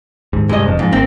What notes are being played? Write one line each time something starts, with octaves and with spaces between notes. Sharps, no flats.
D#2 G#2
D2 G2 C3 G#3 D#5
F1 F2
F2 G#2
G#1 A#3 C4